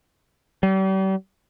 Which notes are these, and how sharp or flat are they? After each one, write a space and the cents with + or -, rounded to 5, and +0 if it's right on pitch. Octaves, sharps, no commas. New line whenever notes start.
G3 -40